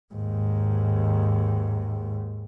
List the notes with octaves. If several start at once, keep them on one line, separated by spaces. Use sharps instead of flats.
D#2 G#2